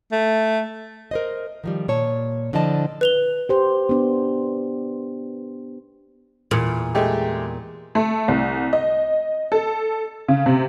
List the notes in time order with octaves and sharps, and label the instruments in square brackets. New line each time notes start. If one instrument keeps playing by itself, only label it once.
[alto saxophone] A3
[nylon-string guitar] A#4 C5 D#5
D#3 F3 G3
A#2 C#5 A5
D3 F3 E4 D5 D#5 A5
[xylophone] B4 F7 G7
[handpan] G4 C5
B3 D4
[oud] E2 A#2
[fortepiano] G#3 A3 G4
[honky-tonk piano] A3
C2
D#5
A4
C#3
C3